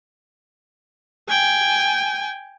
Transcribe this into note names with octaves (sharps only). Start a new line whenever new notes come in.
G5 G#5